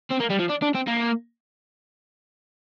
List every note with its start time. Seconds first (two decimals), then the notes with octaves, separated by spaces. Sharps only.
0.11 C4
0.20 A#3
0.30 G3
0.40 F3
0.49 D4
0.62 D4
0.75 C4
0.88 A#3